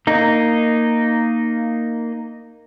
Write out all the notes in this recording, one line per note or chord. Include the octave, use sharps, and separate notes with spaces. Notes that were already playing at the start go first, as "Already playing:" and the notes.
A#3 D#4